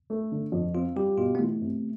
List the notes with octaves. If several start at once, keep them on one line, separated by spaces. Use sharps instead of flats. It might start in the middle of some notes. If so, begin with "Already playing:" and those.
A3
D3
F2
C4 F4
G3 G4
B2 F4
B3
E3 A3
C3